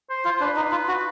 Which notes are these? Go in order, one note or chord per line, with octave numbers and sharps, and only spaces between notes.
C5
F4 C5
D4 B4
D#4
F4
F#4